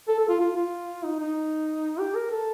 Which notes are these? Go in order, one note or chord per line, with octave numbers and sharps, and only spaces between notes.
A4
A4
F4
F4
F4
D#4
D#4
G4
A#4
A4